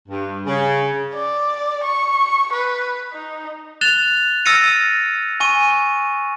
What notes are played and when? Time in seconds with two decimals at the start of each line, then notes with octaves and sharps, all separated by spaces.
0.09 G2
0.46 C#3
1.14 D5
1.84 C#6
2.53 B4
3.13 D#4
3.81 F#6 A6 E7 F7 G7
4.45 E6 F6 A6 A#6 C#7 D#7
5.40 G#5 C#6 D#7